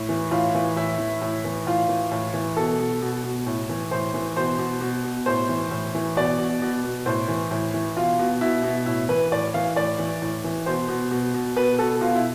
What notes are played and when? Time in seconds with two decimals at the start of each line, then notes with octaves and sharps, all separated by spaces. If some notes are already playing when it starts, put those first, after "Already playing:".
Already playing: A2
0.09 E3
0.31 A2 F4
0.55 E3
0.76 A2 E4
0.98 E3
1.22 A2
1.44 E3
1.67 A2 F4
1.89 E3
2.11 A2
2.34 E3
2.56 B2 A4
2.79 B2
3.02 B2
3.24 B2
3.47 A2
3.69 E3
3.91 A2 C5
4.14 E3
4.36 B2 C5
4.58 B2
4.81 B2
5.04 B2
5.26 A2 C5
5.49 E3
5.71 A2
5.95 E3
6.16 B2 D5
6.39 B2
6.62 B2
6.84 B2
7.06 A2 C5
7.28 E3
7.51 A2
7.74 E3
7.97 B2 F4
8.19 B2
8.41 B2 E4
8.64 B2
8.86 A2 E4
9.09 E3 B4
9.32 A2 D5
9.54 E3 F5
9.76 A2 D5
9.99 E3
10.22 A2
10.44 E3
10.66 B2 C5
10.88 B2
11.11 B2
11.34 B2
11.56 B2 B4
11.79 B2 A4
12.01 B2 F4
12.16 E4